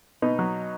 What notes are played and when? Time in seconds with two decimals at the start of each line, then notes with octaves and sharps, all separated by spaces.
0.22 B2 B3 D#4
0.39 F#3